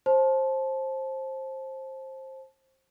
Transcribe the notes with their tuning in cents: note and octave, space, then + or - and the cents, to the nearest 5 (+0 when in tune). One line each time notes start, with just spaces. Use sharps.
C5 +20 A5 -20